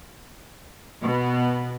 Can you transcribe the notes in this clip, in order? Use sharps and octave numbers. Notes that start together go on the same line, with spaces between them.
B2 B3